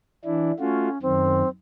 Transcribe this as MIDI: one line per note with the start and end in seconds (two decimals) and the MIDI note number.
0.25 0.51 52
0.25 0.51 62
0.25 0.51 64
0.59 0.89 57
0.59 1.01 61
0.59 0.89 65
0.59 0.89 66
1.02 1.42 42
1.02 1.42 51
1.02 1.49 60